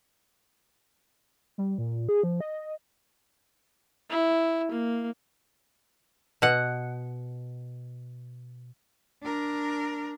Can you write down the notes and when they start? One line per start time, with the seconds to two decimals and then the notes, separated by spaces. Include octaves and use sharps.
1.58 G3
1.78 A#2
2.09 G#4
2.23 F3
2.41 D#5
4.10 E4
4.71 A#3
6.42 B2 F#5
9.22 D4 A#4